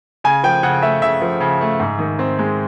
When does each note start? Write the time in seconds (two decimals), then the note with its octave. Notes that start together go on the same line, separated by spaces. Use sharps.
0.24 C#3 G#5
0.43 F3 G5
0.63 C#3 F#5
0.82 A3 E5
1.02 C#3 E5
1.21 F3
1.40 C#3
1.61 A3
1.80 G#2
1.99 D#3
2.19 C4
2.39 G#3